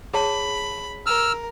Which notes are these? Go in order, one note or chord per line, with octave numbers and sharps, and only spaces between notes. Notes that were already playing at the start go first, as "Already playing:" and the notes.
G#4 C#5 A5 B5
A#4 E6 F6